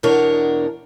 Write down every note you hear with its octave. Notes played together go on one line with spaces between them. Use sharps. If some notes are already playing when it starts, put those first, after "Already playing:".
E2 B2 D4 A#4 C#5